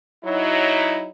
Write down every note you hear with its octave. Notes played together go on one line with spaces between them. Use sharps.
F#3 D#4 E4